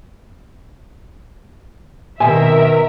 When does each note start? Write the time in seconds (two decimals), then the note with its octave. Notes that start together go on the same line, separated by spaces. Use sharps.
2.20 B2 D#3 C4 A#4 E5 G#5